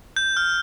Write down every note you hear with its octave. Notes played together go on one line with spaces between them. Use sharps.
G6
F6